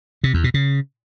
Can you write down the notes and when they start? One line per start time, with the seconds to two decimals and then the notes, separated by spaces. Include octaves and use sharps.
0.24 C3
0.34 E2
0.44 B2
0.54 C#3